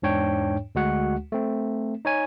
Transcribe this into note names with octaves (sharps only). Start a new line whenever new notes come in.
E2 G#2 D4 C#5 G5
D2 G#3 F#4 F#5
A3 C4
D#4 C#5 G#5